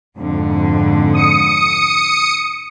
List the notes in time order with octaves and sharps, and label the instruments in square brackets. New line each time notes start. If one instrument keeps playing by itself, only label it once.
[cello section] F2 G#2 D3
[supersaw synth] D#6 C#7